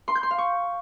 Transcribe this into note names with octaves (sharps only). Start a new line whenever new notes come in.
C6
G6
C6
F5
C#6